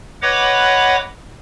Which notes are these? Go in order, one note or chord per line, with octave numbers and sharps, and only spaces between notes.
B4 C#5 D#5 F#5 B5 D6